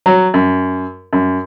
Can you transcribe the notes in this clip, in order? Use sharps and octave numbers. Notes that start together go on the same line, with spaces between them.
F#3
F#2
F#2